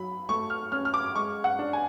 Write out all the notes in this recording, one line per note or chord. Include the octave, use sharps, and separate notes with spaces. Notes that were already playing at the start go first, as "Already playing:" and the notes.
Already playing: F#3 B5
A3 C#6
F6
C#4 F6
F6
D6
G#3 C#6
F#5
D4
G#5